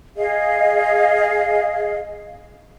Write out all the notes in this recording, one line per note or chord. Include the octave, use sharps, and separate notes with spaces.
G#4 D#5 F5